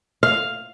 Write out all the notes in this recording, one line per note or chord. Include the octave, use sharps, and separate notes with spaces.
F5